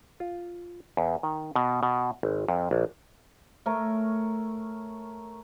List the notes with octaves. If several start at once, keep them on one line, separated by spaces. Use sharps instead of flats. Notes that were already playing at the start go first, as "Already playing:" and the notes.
F4
E2
D#3
B2
B2
G#1
F2
A#1
A3 A#4 C#5